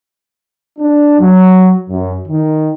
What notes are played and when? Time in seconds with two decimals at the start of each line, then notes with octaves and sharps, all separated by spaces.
0.79 D4
1.19 F#3
1.90 F#2
2.27 D#3